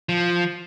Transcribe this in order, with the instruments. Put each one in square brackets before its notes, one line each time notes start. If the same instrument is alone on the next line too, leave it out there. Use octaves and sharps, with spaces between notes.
[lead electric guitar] F3